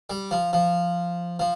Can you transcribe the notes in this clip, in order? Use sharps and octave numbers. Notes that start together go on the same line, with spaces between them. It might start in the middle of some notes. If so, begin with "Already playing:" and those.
G3
F3
F3
F3